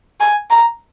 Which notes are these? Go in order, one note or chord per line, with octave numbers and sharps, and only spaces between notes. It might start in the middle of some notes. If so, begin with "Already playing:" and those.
G#5
A#5